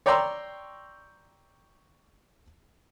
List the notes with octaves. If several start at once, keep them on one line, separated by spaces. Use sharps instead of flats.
C#5 D5 G5 A#5 C6 E6